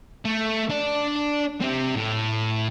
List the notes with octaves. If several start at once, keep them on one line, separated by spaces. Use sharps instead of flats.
A3
D4 D5
C4 G4
A2